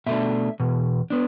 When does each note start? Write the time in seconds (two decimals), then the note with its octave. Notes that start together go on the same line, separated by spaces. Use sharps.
0.06 B2 A3 D4 E5
0.60 E2 B2
1.10 B3 D4